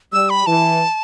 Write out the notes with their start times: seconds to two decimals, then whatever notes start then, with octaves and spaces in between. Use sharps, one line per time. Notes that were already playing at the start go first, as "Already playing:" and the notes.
0.13 G3 E6
0.30 B5
0.46 E3 A5